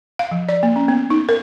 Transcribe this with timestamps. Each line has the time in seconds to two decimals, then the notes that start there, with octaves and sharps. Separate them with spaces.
0.19 F5
0.31 F3
0.49 D5
0.63 A#3
0.76 C#4
0.88 B3
1.10 D#4
1.29 A#4